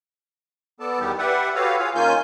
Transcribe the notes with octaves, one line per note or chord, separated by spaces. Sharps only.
B3 A4 D5 A5
E2 D#3 G3 B3 G4
G4 B4 D5 E5 F#5
F#4 G4 A4 B4 C#5 F5
F4 G#4 C#5 F5
D#3 A#3 C#4 F4 G#5 G6